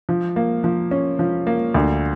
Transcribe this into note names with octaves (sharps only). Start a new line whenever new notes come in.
F3
A#3
F3
C#4
F3
A#3
D2